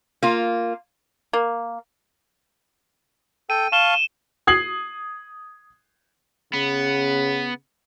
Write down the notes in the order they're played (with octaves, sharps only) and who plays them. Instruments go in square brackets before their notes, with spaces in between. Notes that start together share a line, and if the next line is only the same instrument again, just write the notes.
[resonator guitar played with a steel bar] A#3 F4
[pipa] A#3
[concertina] A4 G5 [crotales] D#7
[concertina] F5 A5 C#6 [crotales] E7 G7
[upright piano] D#6 G#6 C7 F#7
[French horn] C#3 [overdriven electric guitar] B3